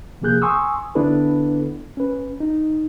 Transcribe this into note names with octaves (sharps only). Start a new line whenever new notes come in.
C3 F3 A#3 G#4 F#6 G6
G#5 C6 C#6 D#6 E6
D3 B3 D4 E4 A4 B4
C#4 B4
D#4